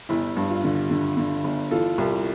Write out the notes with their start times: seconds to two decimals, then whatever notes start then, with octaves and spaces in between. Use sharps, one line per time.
0.09 G1 E4
0.37 G2
0.50 F4
0.64 D3
0.90 D3
1.17 D3
1.44 G1
1.71 E3 F4 A4
1.98 C2